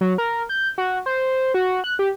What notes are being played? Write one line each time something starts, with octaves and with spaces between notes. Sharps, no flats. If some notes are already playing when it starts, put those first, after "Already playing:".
F#3
A#4
G6
F#4
C5
F#4
F#6
G4